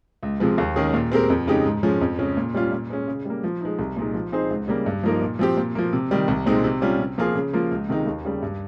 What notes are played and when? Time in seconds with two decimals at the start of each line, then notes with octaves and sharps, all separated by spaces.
0.23 C#2
0.40 C3 F3 G#3
0.58 D#2
0.76 D#3 G#3 C#4 G#4
0.94 A#2
1.12 G#3 C4 G4 A#4
1.30 F2
1.47 C#3 G#3 D#4 G4
1.65 G#2
1.83 F3 G#3 C#4
2.01 F2
2.19 C#3 G#3 C#4
2.37 A#2
2.54 G3 C#4 F4
2.72 A#2
2.90 G#3 C#4
3.08 C#3
3.25 G3 A#3
3.44 F3
3.61 G#3 D#4
3.79 C2
3.97 A#2 G#3 D#4
4.14 F3
4.32 C4 D#4 G#4 C5
4.50 C#2
4.68 C#3 G3 A#3
4.86 G2
5.03 F3 A#3 D#4 A#4
5.21 A#2
5.39 F3 C4 G4
5.57 A#2
5.75 F3 A#3
5.93 C3
6.11 D#3 G3
6.28 C2
6.46 A#2 G#3 C4 D#4
6.64 C3
6.82 G3 C#4 F4
6.99 C3
7.18 F3 A#3 F4 G#4
7.36 C#3
7.53 F3 A#3 F4
7.71 C#2
7.89 C3 D#3 G#3 D#4
8.07 D#2
8.25 C#3 G3
8.42 G2